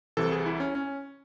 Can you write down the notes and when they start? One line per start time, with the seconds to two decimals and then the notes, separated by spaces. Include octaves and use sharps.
0.17 C2 C3 E3 A4
0.32 G#4
0.46 E4
0.60 C#4
0.75 C#4